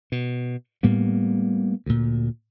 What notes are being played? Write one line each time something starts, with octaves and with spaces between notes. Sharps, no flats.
B2
A2 G3 A#3 B3
D2 A#2